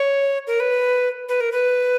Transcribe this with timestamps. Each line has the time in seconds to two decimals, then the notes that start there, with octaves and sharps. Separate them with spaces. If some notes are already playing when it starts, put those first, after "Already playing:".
Already playing: C#5
0.47 A#4
0.60 B4
1.29 B4
1.41 A#4
1.52 B4